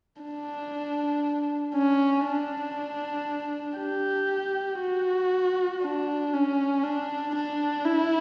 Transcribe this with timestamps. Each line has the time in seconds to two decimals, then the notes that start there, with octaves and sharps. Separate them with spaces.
0.22 D4
1.75 C#4
2.26 D4
3.79 G4
4.81 F#4
5.82 D4
6.33 C#4
6.84 D4
7.35 D4
7.86 E4